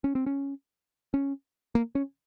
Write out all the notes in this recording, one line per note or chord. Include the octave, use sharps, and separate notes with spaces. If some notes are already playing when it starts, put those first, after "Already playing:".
C#4
C4
C#4
C#4
A#3
C#4